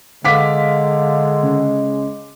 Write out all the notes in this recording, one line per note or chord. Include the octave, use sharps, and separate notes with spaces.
D3 G#3 F5 D6 B6
C#3